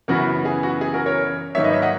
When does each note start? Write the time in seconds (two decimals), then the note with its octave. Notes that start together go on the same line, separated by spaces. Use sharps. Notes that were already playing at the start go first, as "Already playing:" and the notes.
0.08 F#2 C#3 E3 B3 F#4 A#4
0.45 G#4
0.63 F#4
0.81 G#4
0.94 F#4 A#4
1.06 A#4 C#5
1.55 G#2 D#3 F#3 A#3 C#5 E5
1.64 B4 D#5
1.73 C#5 E5
1.82 D#5 F#5